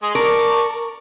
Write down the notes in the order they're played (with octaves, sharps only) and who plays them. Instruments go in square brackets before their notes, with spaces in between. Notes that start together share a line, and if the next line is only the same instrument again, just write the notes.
[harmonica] G#3 G#4 D#5
[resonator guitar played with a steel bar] A#4 [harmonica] D5 A5 C#6